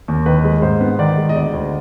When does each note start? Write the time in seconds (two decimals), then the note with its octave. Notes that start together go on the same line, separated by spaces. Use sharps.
0.08 D#2
0.26 D#3 B4
0.44 G#3
0.62 G#2 C5
0.81 B3
0.99 D#3 D5
1.17 G#3
1.29 D#5
1.35 D2 D5
1.53 D2